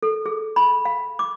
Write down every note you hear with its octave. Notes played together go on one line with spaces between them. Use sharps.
A4
G#4
B5
F5
D6